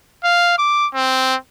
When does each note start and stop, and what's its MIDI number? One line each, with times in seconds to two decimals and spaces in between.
0.25 0.56 77
0.58 0.87 86
0.94 1.35 60